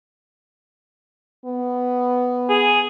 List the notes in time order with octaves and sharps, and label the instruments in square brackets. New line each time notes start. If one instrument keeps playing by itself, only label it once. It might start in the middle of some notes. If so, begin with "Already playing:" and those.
[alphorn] B3
[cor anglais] G#4